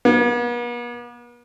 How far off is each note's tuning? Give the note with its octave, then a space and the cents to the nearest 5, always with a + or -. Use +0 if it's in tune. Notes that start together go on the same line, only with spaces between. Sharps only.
B3 -45